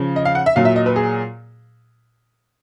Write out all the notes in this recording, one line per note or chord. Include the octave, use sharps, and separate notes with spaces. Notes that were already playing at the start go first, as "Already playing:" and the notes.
Already playing: C#3 F3
D#5
F5
F#5
E5
A#2 F#3 F5
E5
D#5
B4
G#4